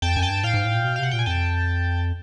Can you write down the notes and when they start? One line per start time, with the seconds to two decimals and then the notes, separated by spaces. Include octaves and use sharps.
0.02 F2 G5 A5
0.16 F#2 G#5
0.22 G5 A5
0.30 G2
0.43 A2 F5 G5
0.54 G#2
0.65 A2
0.75 A#2
0.85 B2
0.96 F5
0.99 C3 F#5
1.11 A#2 G5
1.19 G#5
1.26 F2 G5 A5